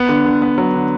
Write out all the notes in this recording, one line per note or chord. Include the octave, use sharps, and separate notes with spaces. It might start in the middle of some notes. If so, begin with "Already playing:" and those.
Already playing: B3
D3
D3
B3
F#3
D3